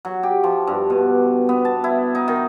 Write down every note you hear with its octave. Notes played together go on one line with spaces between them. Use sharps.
F#3
G4
F3
G2
B2
B3
A5
E4
D#4
D#3